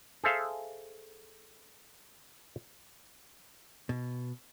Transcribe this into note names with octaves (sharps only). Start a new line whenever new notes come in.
G#4 A4 C5 E5 F5
B2